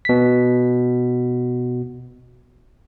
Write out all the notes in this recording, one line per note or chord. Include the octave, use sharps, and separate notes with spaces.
B2 B6